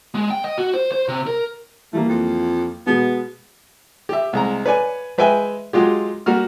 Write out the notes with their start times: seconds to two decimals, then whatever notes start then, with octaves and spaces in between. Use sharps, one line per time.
0.15 G#3
0.30 G5
0.44 D#5
0.58 F#4
0.74 C5
0.92 C5
1.08 C3
1.27 A#4
1.93 E3 G3 A3 A#3
2.09 F2
2.87 B2 G#3 B3
4.09 G4 E5
4.33 C2 G#3 A#5
4.66 B4 C#5 D5 G#5
5.18 G#3 B4 E5 G5 G#5
5.73 F#3 G#3 F4 G4
6.26 G3 A#3 F#4 F6